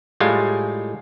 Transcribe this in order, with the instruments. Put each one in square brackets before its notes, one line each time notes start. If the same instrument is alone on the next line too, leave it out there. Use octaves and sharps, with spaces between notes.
[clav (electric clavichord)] A2 G3 G#3 F4 G#5